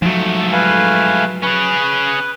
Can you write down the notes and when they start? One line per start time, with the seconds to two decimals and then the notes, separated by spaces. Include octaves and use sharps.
0.02 G#2 F3 F#3 A3
0.52 B4 F5 G#5
1.43 C#4 G#4 B4